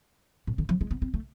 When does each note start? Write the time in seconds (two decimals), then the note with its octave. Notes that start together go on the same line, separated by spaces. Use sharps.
0.47 A2
0.58 D3
0.69 F3
0.81 G#3
0.91 B3
1.02 C4
1.14 A3